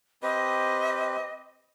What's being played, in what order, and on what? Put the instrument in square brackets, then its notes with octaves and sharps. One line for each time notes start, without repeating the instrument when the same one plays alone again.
[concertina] C4 G4 B4 [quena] D#5